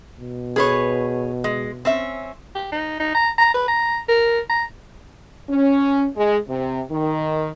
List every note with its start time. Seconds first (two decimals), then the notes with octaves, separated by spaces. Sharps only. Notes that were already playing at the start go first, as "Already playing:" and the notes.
0.20 B2
0.56 G#4 B4 C#5
1.44 G#3
1.85 C4 C#4 E5
2.55 G4
2.72 D#4
3.00 D#4
3.15 A#5
3.38 A#5
3.54 B4
3.68 A#5
4.09 A#4
4.50 A#5
5.49 C#4
6.16 G#3
6.48 C3
6.91 D#3